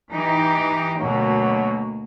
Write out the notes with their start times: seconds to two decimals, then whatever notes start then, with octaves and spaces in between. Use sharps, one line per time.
0.12 E3 D#4 G4
0.99 D2 B2 F#3 A#3